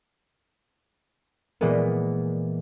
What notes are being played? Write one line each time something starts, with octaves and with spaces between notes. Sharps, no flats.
A#2 E3 G#3 A#3 B3